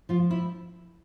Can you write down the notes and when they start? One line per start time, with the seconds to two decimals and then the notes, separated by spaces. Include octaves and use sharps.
0.09 F3 F4
0.31 E4